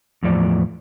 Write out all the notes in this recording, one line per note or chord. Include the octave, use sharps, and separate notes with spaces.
E2 A2 F3 D5